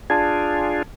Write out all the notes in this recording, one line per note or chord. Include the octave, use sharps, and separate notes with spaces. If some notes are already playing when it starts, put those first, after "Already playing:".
D4 F4 G#4 A5 G#6